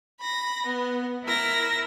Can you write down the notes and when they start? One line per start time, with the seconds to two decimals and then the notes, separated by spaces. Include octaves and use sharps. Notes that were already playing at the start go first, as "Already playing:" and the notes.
0.20 B5 A#6
0.66 B3
1.25 E4 A#4 E6 A#6